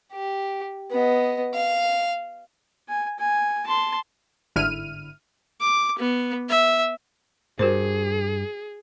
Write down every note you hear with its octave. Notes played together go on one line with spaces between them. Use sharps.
G4
B3 D#5
F5
G#5
G#5
A5 C6
G1 G#2 D3 E4 F6 D#7
D6
B3
E5
G2 F#4 G#4 A#4 C5